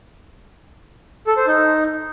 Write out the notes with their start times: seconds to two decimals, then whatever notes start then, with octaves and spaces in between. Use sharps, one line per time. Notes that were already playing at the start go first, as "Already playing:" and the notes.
1.27 A4
1.37 C5
1.47 D#4